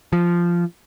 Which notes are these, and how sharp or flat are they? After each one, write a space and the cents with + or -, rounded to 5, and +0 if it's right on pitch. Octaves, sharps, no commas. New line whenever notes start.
F3 -10